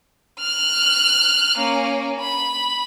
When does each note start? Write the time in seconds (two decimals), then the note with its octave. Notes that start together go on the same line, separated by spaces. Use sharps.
0.40 F6 F#6
1.58 A#3 C#4
2.20 B5